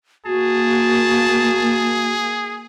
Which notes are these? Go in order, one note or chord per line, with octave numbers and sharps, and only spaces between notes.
A#3 F#4 G#4 A5